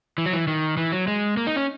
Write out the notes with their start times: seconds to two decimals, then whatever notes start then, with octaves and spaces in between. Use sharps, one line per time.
0.18 E3
0.26 F#3
0.33 E3
0.47 D#3
0.77 E3
0.92 F#3
1.08 G#3
1.37 A#3
1.47 D#4
1.56 C#4